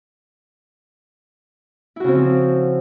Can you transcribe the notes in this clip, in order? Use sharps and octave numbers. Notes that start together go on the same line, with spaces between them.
C#3 F3 C4 E4 F#4